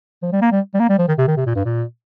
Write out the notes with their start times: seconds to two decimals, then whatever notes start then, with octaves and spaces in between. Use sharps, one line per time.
0.22 F3
0.32 G3
0.41 A#3
0.51 G3
0.74 G3
0.80 A#3
0.89 G3
0.98 F3
1.08 D#3
1.18 C3
1.27 D#3
1.37 C3
1.46 A#2
1.56 G2
1.65 A#2